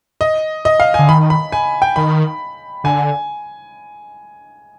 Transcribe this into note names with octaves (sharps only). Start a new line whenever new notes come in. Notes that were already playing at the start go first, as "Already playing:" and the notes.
D#5
D#5
F5
G#5
D3
D#3 B5
B5
G#5
G5
D#3 B5
D3 G#5